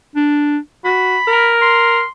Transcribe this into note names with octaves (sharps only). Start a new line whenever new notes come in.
D4
F#4 B5
A#4
C6